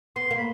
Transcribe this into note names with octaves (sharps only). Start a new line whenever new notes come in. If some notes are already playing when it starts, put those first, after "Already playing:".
B3 C6
A#3
B5